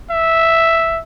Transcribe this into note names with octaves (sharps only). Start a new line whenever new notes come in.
E5